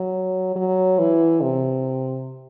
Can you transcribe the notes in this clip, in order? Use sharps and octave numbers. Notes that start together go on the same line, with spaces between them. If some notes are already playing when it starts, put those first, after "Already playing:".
Already playing: F#3
F#3
E3
C3